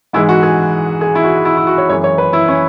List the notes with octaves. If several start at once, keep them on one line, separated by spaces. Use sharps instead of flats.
G#2 E3 G#3 E4
F#4
G#4
G#4
E4
F#4
E4
E4
F#4
C#5
F#2 E3 G#3 C#5
C#5
B4
E4
C#4